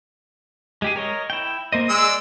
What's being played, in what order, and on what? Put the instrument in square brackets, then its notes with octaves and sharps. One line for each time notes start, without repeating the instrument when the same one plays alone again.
[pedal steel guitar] G#3 G4 G#4
A#4 C#5 D#5
E4 G5
A#3 C5 D#5
[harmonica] G#3 E6 [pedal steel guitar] D5